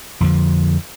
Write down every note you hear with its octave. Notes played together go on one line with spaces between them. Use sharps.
F2 D3 F3